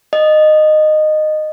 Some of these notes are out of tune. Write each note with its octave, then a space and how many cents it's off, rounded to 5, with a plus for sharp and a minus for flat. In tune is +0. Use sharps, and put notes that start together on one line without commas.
D#5 -15